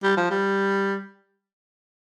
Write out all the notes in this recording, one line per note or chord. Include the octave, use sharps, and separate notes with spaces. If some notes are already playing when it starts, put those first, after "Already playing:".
G3
F3
G3